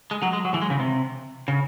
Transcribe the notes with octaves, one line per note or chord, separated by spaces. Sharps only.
G#3
F#3
G#3
F#3
E3
G#3
C#3
C3
C#3